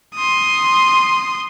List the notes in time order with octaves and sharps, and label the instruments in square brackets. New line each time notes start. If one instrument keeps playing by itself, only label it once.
[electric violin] C6 D#6